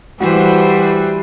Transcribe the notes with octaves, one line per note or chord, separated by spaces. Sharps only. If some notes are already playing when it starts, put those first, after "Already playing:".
E3 G3 F#4 B4 C5 E5